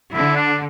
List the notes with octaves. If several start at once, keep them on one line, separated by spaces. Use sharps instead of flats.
D3 E4
D4